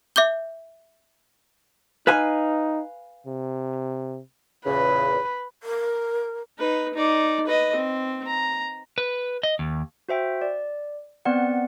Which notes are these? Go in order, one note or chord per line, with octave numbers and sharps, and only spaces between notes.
E5 D6 G6 G7
D#4 B4 F5 G#5
C3
E2 A#2 C#3 B4
A#4
D#4 B4
D#4 D5
B4 D#5
C4
A#5
B4
D#5
D#2
F#4 C5 E5 G5
D5
B3 C4 D5 F#5